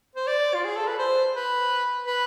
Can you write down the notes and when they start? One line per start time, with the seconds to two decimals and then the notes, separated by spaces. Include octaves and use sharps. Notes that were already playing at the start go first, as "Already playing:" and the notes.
0.16 C5
0.27 D5
0.54 F4
0.65 G#4
0.76 A4
0.88 B4
0.99 C5
1.35 B4
2.07 B4